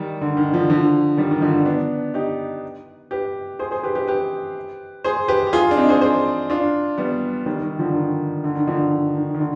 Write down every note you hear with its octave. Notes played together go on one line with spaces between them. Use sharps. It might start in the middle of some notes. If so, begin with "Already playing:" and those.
Already playing: D#3 G3
D3
D#3
D3 F3
D3 F3
D#3 G3
D#3
D3 F3
B3 D4
D#4 G4
G4 B4
G#4 C5
G#4 C5
G4 B4
G4 B4
G4 B4
G#4 C5
G4 B4
G4
F4 G#4
D4
C4 D#4
G#4 C5
G#4 C5
D4 F4
G3 B3
D#3 G3
D#3
D3 F3
D#3
D3
D#3
D3 F3
D#3
D#3
D#3
D3